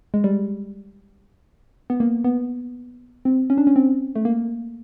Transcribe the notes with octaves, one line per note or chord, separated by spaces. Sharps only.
G#3
G3
B3
A#3
B3
C4
C#4
D4
C#4
C4
A3
A#3